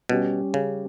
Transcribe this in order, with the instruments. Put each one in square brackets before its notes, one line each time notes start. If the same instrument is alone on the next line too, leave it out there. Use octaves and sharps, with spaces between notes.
[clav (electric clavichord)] B2 [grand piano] G3 C#4 G4
[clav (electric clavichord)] C#3